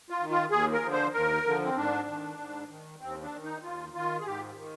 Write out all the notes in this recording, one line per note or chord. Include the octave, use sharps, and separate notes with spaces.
F4
D#3
F4
D#2 G#4
A#4
D3 F3
C5
D#2 A#4
D3 F3
C4
G#2 D4
D#3
G#2
D#3
D#2 C4
D4
D#3
D#4
D#2 F4
D#3 F4
G#4
G#2 G4
D#3